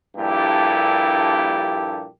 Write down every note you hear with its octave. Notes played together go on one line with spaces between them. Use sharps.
A#1 G2 A#2 E4 G4 A4